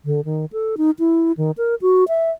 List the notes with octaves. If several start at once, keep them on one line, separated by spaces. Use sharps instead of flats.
D3
D#3
A4
D#4
E4
D#3
A#4
F#4
E5